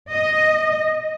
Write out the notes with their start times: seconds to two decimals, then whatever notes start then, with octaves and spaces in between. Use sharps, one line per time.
0.12 D#5